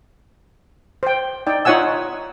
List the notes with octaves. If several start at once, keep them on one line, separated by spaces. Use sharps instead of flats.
C5 G5
D#4 D5 G5
D#4 F4 C#5 F#5 G#5 E6